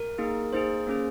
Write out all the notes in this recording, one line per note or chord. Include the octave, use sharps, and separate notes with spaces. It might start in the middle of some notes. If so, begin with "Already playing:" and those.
Already playing: A#4
A#3 D#4 G#4
A#3 D#4 G#4 C5
A#3 C#4 G#4